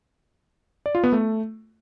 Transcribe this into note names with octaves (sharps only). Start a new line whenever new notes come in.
D5
F4
B3
A3